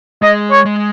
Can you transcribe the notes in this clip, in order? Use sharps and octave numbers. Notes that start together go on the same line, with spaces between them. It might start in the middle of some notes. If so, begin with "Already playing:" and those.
G#3 D#5
C#5
G#3